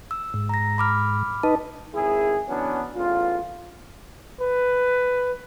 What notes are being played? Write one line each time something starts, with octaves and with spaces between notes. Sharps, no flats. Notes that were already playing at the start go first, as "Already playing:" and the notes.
E6
G#2
A#5 A#6
B5 D6 F6
D#4 B4 D#5 A5
G#1 E4 G#4
E3 F#3 B3 C#4 D4
A1 E2 F4
B4